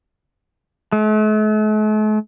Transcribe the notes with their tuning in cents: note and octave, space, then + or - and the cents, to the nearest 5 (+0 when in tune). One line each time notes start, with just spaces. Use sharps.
A3 -45